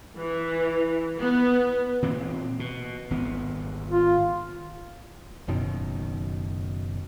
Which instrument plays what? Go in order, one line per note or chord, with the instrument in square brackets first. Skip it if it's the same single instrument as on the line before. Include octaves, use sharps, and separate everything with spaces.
[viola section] E3
B3
[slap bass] A#2 E3 C4
B2
G#1 B3
[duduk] F4
[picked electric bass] F#1 F#2 B2 D#3